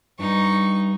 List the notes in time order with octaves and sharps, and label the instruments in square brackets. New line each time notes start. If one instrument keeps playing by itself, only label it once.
[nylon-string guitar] G2 [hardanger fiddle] D#4 C#6